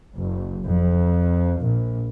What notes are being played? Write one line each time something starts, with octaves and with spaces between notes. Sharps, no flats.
F#1
F2
A#1